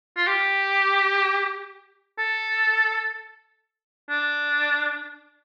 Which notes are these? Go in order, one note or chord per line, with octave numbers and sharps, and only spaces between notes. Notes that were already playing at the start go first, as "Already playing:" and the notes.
F4
G4
A4
D4